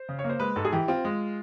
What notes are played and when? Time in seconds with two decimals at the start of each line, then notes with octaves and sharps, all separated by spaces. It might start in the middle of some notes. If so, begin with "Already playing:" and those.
Already playing: C5
0.09 C#3
0.19 C#5
0.24 A#3
0.29 C5
0.39 G#3 B4
0.56 G#2 A4
0.65 G#4
0.73 E3 G4
0.88 C4 F4
1.05 G#3